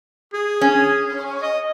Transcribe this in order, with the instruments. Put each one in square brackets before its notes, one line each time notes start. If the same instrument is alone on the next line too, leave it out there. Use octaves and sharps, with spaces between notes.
[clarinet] G#4
[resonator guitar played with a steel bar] C#4
[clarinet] D#5